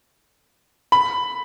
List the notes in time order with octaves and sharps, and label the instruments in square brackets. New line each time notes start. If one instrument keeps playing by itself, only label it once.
[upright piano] B5